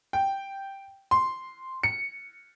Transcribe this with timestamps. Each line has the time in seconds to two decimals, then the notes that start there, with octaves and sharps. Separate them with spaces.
0.13 G5
1.11 C6
1.83 C#7